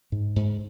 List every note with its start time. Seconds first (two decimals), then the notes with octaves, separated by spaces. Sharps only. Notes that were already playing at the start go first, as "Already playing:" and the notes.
0.12 G#2
0.36 G#2